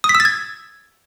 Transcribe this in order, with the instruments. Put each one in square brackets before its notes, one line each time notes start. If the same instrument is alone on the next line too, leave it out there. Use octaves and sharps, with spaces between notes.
[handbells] D#6
B6
E6
A6
G#6